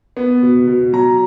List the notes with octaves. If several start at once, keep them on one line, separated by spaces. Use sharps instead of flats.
B3
B2
B2
F#3 A#5